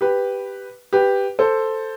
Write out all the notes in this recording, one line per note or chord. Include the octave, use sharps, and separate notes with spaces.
G4 B4
G4 B4
A4 C5